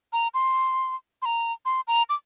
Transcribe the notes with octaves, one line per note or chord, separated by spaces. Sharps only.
A#5
C6
C6
A#5
C6
A#5
D6